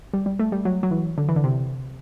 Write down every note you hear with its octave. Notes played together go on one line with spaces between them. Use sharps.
G3
G3
A3
G3
F#3
F#3
E3
D3
E3
D3
C3